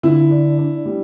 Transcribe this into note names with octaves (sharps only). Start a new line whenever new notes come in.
D3 E4
D4
D4
G3